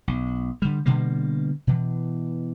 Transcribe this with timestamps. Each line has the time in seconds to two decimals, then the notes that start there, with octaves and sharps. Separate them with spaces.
0.08 B1
0.62 D3 G3
0.86 B2 D3 G3 A#3
1.67 B2 E3